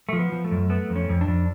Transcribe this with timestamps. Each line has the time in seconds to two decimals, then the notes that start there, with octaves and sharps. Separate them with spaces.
0.09 F3 A3
0.18 B3
0.32 F3
0.44 A3
0.51 F#2
0.70 A3 B3
0.90 F2
0.96 C#4
1.09 F2
1.21 D4
1.28 F2